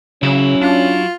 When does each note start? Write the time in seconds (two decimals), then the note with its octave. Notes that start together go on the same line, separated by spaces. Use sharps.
0.23 C#3 F#3 C#4 E4
0.61 D4 F4